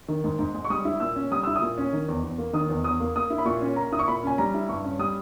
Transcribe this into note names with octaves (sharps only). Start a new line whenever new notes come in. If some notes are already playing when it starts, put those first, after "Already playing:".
D#3
G#2
G#2
G#3
C#6
G3 D#6
E4
A#2 E6
C#4
G3 D#6
E4 E6
D#6
A#2
C#4
D#3
E2
E2
A#3
D#3 D#6
E2
E2 D#6
A#3
A#3 D#6
E4
B5
A#2 C#6
C#4
A#3 A#5
E4 D#6
C#6
A#2 B5
C#4 G#5
G3 A#5
E4
G2 C#6
C#4
G3 D#6